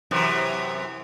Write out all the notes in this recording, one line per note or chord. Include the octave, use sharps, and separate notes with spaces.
F#2 C3 E3